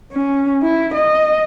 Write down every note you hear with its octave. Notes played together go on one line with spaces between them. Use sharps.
C#4
E4
D#5